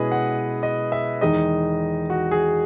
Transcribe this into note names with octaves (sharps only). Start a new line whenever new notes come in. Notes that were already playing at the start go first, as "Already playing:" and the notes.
Already playing: B2 G#3 C#4 E4 G#4 B4 D#5
F#5
D#5
E5
E2 D#3 G#3 D#4 D#5
F#4
G#4